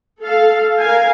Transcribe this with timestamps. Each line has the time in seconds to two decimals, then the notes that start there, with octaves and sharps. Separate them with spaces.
0.22 A4 F5
0.79 A#4 F5 G#5